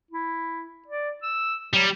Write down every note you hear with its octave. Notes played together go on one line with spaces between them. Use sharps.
E4
D5
E6
F#3 G3